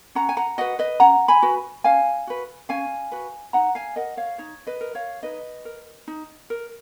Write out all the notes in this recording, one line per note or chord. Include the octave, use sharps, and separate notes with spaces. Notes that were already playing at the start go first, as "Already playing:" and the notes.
C#4 F#5 A#5
G#5
F#5 A#5
F#4 B4 D#5 F#5
B4 D#5
C#4 F#5 A#5
G#5 B5
F#4 B4
C#4 F5 G#5
F#4 B4
C#4 F5 G#5
F#4 B4
D#4 F#5 A#5
F5 G#5
A#4 D#5 F#5
C#5 F5
D#4 C#5
B4 D#5
A#4
C#5 F5
D#4 B4 D#5
A#4
D#4
A#4